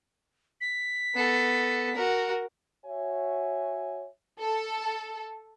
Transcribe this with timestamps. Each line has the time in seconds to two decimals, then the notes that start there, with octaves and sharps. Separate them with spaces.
0.61 B6
1.15 B3 A4
1.95 F#4 A#4
2.85 F#4 C#5 E5 G#5
4.39 A4